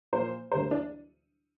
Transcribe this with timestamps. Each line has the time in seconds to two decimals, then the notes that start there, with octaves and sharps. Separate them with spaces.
0.13 A#2 F3 A#3 C5
0.51 D2 D3 G3 A#3 C5
0.71 D4